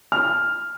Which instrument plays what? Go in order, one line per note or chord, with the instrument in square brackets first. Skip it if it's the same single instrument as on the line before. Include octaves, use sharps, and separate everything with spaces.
[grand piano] F6